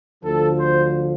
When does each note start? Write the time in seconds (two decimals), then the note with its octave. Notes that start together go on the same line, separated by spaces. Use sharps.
0.23 D2 D3 F3 A4
0.60 C5